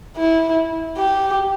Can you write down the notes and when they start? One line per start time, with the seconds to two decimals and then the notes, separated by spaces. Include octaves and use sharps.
0.16 E4
0.97 G4